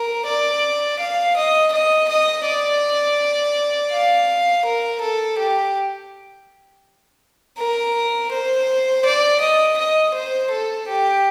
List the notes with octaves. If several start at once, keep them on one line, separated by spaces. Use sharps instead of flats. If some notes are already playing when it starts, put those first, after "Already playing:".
Already playing: A#4
D5
F5
D#5
D#5
D#5
D5
F5
A#4
A4
G4
A#4
C5
D5
D#5
D#5
C5
A4
G4